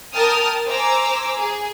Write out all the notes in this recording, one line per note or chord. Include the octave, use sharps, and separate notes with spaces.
A#4 G5 A5 D#6 F6
C5 G#5 A#5 D6 E6
G#4